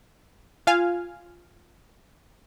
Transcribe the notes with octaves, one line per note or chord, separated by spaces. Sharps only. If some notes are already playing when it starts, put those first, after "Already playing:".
F4 F5 G#5